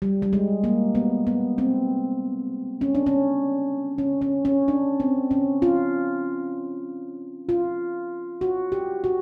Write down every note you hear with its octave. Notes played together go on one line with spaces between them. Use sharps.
G3
G3
G#3
A#3
B3
B3
C4
C#4
D4
C#4
C#4
C#4
C#4
D4
C4
C#4
F4
F4
F#4
G4
F#4